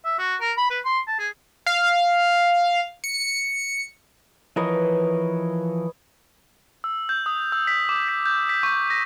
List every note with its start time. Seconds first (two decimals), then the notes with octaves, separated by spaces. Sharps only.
0.05 E5
0.19 F#4
0.41 A#4
0.58 B5
0.70 B4
0.85 C6
1.08 A5
1.19 G#4
1.66 F5
3.04 C#7
4.56 E3 F3 A#4 B4 C#5 D#5
6.84 E6
7.09 G6
7.26 D#6
7.52 E6
7.67 B6
7.89 D6
8.08 B6
8.26 G6
8.49 B6
8.63 C#6
8.90 A#6